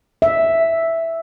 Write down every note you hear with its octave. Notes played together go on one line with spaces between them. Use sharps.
E5